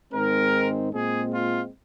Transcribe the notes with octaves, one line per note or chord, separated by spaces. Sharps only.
G#2 D#3 G#3 C4 A#4
A#2 G#3 C4 G#4
F4